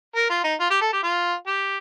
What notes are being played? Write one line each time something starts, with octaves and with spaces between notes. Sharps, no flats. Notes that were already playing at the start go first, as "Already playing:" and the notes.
A#4
F4
D#4
F4
G4
A4
G4
F4
G4